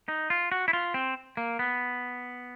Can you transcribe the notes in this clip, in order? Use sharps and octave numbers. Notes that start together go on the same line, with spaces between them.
D#4
F4
F#4
E4
F4
C4
A#3
B3